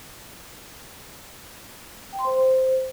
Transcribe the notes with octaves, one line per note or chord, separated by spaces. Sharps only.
G5
C6
C5